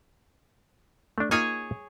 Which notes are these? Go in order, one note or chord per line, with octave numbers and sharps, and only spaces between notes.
A3 D4
A#3 D#4 F4 G#4 C#5 G#5